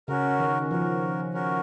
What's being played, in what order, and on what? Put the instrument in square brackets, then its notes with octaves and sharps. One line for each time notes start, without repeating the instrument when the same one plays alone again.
[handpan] C#3 [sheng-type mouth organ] C#4 F#4 A#4
[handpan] D#3
[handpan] F3 [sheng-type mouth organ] C#4 F#4 A#4
[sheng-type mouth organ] C#4 F#4 A#4